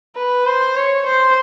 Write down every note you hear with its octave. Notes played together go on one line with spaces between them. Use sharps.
B4
C5
C#5
C5